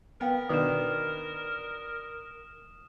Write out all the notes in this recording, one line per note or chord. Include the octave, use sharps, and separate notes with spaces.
B3 A#4 F5 G5 B5
B2 D#3 D4 B4 D#5 D#6 F6 E7